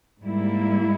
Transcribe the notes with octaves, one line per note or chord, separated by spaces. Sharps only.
G#2 G3 A#3 E4